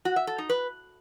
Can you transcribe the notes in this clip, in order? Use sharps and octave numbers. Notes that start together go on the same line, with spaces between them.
F#4
E5
A4
D#4
B4